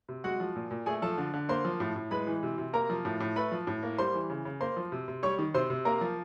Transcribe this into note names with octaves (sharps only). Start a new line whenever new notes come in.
C3
G#3 F#4 F#5
F3
A#2
A#2
A3 G#4 G#5
F3 A4 A5
D3
D3
A#3 C5 C6
F3
A2
A2
G#3 B4 B5
E3
C3
C3
A#3 A#4 A#5
F3
A2
A2
A3 B4 B5
F3
A2
A#3
G3 C5 C6
E3
C#3
C#3
A#3 C5 C6
F3
C3
C3
G3 C#5 C#6
D#3
C3 C5 C6
C3
A#3 A#4 A#5
F3